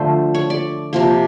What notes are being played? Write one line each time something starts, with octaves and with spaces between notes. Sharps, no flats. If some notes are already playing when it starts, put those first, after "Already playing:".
Already playing: D3 F3 A3 C5
C#5
D5
C3 F3 A#3